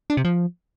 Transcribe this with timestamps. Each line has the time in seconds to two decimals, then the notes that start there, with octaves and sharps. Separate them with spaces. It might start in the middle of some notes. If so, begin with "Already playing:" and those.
0.10 D4
0.17 C3
0.25 F3